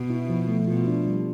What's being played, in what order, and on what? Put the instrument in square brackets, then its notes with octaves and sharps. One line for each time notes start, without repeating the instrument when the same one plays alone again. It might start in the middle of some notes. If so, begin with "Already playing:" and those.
Already playing: [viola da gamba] B2
[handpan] E4
F3
A3
[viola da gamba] B2 [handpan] F4
[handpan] D4
G3